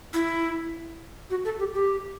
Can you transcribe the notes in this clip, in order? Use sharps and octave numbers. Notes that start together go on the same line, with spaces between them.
E4
F#4
A4
G4
G4